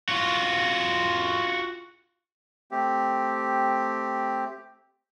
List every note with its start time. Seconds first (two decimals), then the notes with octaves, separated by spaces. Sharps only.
0.09 F4 F#4
2.71 A3 C4 G4